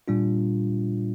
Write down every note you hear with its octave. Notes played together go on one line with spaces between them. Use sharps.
A#2 G3 D4 F4